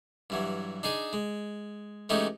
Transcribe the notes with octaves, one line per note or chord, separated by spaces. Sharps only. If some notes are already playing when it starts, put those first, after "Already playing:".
G2 E3 F#3
D4 D#4 G#4 D6
G#3
E3 G#3 A3 C#4 D#4 G4